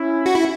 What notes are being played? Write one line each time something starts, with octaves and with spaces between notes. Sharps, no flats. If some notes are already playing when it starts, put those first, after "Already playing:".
Already playing: C#4 E4
F#4
E4